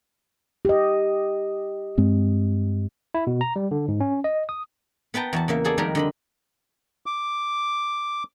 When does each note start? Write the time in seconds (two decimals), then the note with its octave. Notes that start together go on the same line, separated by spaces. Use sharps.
0.65 G4 D#5
1.98 G2 G#3 C4
3.14 E4
3.27 B2
3.41 A#5
3.56 G3
3.71 D3
3.88 G#2
4.00 C#4
4.24 D#5
4.49 D#6
5.14 B3 B4 G5 A5 A#5
5.33 E2 F#4 A5
5.48 C#3 A#3 E5
5.64 F#4 G#4 A4 D5
5.78 F2 D#3 G3 G#3 A#4
5.95 D3 D#5 B5
7.06 D6